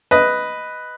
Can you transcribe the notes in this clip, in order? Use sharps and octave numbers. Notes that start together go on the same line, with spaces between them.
B4 D#5